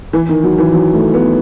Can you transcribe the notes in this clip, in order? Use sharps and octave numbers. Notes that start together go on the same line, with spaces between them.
E3
D#3
F#3
E3
F#3
A3
B3